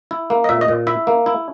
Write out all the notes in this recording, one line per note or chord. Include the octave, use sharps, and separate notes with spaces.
E4
A#3
D#5
A#2 E5
D#5
A#2
E4 E5
A#3
E4